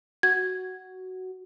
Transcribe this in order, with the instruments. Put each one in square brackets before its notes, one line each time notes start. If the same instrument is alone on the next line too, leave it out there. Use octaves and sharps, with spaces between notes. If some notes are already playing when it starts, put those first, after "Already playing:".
[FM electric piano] F#4 [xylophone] G#6